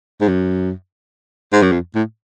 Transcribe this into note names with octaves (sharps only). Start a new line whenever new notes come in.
G#2
F#2
G#2
F#2
F2
A2